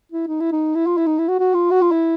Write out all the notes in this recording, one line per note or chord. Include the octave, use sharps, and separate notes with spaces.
E4
D#4
E4
D#4
E4
F4
E4
D#4
E4
F#4
F#4
F4
F#4
F4
E4